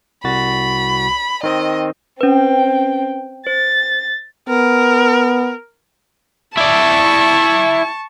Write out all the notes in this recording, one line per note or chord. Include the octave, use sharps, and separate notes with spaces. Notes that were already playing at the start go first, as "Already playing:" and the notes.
C2 F#4 B5 A6
D#3 C4 D#5
C4 C#4 B4 G5
C5 A6
B3 A#4
E4 D5 A5 C#6